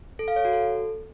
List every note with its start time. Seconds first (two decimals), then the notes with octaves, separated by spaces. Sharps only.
0.19 A4
0.28 F5
0.36 C#5
0.45 F#4
0.53 A4